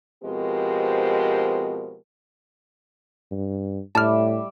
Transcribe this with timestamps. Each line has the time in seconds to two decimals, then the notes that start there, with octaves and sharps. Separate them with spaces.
0.24 B2 F3 G#3 C4 G4 A#4
3.31 G2
3.95 A2 G3 D5 E5 A5 F6